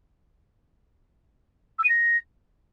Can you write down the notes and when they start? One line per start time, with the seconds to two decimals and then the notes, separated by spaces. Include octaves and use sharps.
1.78 E6
1.84 D#7
1.89 A#6